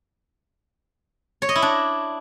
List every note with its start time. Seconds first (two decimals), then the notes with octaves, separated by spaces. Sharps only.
1.42 C#5
1.49 D#5
1.56 E4
1.62 D4